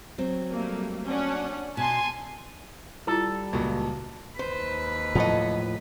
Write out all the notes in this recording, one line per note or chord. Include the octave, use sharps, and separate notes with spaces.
F#3 C4
G3 A3 A#3
C#4 D4 F#5
B2 G#5 A5 C6
G3 E4 F4 A4 A#5
C#2 A#2 F#3
D#2 B4 C5
A2 F3 F#3 A4 D#5